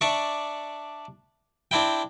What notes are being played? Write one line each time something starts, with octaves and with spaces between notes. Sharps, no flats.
D4 D5 E5 C#6
C4 D4 E4 G5